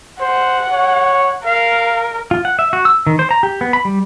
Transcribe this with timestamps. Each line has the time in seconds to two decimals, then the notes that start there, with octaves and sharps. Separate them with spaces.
0.21 C5 F#5
0.72 C#5
1.46 A#4 F5
2.31 F4
2.45 F#5
2.59 E5
2.73 F#4
2.85 E6
3.07 D#3
3.19 C5
3.31 A#5
3.43 G4
3.61 B3
3.73 B5
3.85 G3